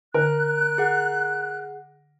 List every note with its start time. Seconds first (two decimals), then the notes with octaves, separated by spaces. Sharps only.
0.14 D3 A#4 F#6
0.78 G#4 F#5